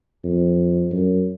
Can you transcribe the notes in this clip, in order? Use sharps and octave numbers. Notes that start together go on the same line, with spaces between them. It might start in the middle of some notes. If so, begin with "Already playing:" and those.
F2
F#2